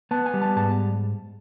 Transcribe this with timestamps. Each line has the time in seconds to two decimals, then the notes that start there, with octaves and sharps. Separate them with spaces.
0.11 B3 A5
0.26 G#5
0.34 G3
0.42 A5
0.56 G#2 A5